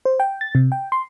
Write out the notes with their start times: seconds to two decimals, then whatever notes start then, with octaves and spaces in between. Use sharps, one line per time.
0.05 C5
0.20 G5
0.41 A6
0.55 C3
0.72 G5
0.92 C6